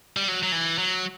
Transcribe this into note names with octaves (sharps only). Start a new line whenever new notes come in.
G3
F#3
F#3
E3
F#3